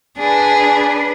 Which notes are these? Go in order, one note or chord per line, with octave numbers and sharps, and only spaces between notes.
D4 G#4 B4